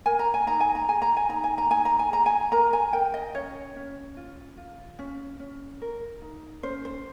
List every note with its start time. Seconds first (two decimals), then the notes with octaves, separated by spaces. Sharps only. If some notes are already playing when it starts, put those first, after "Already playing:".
0.06 A#4 G#5
0.19 A#5
0.34 G#5
0.46 D#4 A#5
0.60 G#5
0.75 A#5
0.88 G#4 G#5
1.02 A#5
1.17 G#5
1.29 D#4 A#5
1.44 G#5
1.58 A#5
1.70 D#4 G#5
1.85 A#5
1.99 G#5
2.11 G#4 A#5
2.26 G#5
2.52 A#4 A#5
2.73 G#5
2.93 A#4 G5
3.14 D#5
3.35 C#4 C#5
3.76 C#4
4.17 F4
4.57 F4
4.99 C#4
5.39 C#4
5.82 A#4
6.22 D#4
6.63 C#4 C5
6.85 C5